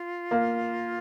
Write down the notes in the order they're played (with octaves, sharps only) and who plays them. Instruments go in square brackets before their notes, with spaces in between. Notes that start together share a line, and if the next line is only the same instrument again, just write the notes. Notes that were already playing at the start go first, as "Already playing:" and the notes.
Already playing: [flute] F4
[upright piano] A#3